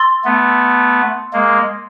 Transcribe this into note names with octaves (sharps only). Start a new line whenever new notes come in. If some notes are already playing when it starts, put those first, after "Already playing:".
Already playing: C6 E6 A6
A3 B3
G#3 A#3